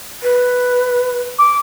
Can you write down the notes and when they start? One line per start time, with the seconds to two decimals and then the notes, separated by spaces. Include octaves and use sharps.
0.23 B4
1.39 D6